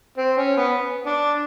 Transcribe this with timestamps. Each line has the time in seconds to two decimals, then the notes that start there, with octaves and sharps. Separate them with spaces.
0.18 C4
0.38 C#4
0.57 B3
1.06 D4